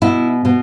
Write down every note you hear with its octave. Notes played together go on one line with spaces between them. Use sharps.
B2 E4
B2